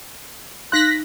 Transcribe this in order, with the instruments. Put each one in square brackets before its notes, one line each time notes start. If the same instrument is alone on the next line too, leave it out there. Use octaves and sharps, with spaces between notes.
[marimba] D#4 F5 C6 [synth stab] F#6 A#6 B6